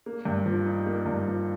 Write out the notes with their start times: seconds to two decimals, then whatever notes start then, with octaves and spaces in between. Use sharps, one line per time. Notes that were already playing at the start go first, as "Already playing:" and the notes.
0.06 A#3
0.25 G2
0.46 F3
0.66 D#4
0.86 A#3
1.06 G2
1.27 F3